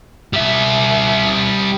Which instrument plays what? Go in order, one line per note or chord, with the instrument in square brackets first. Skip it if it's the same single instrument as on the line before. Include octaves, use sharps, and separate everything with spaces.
[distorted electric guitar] G3 E5